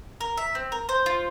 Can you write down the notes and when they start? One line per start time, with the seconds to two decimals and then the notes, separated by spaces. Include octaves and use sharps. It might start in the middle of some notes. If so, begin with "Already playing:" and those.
0.21 A#4
0.37 E5
0.55 C4
0.72 A#4
0.89 C5
1.06 F4